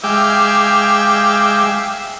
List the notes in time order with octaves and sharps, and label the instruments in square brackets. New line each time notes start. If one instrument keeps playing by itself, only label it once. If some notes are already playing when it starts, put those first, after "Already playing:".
[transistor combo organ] G#3 G5 D6 [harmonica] E5 F5